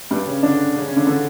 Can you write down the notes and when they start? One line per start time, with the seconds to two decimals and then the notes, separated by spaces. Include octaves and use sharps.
0.11 G2 G3
0.26 C#3 C#4
0.43 D3 D4
0.75 C#3 C#4
0.85 C#3 C#4
0.96 D3 D4
1.07 D3 D4